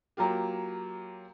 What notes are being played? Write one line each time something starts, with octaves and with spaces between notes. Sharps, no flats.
F#3 A#3 F4 G4